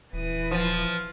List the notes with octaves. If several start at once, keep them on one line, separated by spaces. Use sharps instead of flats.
D#1 E3 B4 D#6
F3